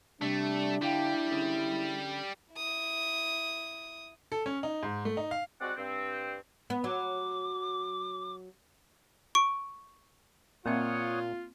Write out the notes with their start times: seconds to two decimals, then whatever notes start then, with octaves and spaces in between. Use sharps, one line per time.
0.22 C3 G3 A3 D4
0.82 D3 G3 E4 F5 G5
1.31 D3 C#4 G#4
2.53 E4 D#6
4.32 A4
4.46 C#4
4.63 D#4
4.83 G#2
5.05 A3
5.17 D#4
5.31 F5
5.61 G3 G#3 C4 F#4 D5 F#5
5.77 G2 C4
6.70 B3
6.84 F#3 D6
9.35 C#6 D7
10.66 A#2 A#3 C4 F4 C#5 E5 F#5 D#6